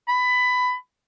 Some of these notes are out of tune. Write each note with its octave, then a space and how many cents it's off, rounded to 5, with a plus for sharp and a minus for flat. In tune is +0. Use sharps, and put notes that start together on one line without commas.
B5 +15